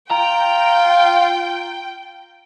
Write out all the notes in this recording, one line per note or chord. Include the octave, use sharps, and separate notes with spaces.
F4 G5 A#5